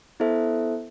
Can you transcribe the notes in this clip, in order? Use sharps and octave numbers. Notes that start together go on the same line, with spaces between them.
B3 E4 A4 C5 E5